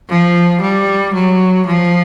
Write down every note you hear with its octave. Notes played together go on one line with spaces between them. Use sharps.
F3
G3
F#3
F3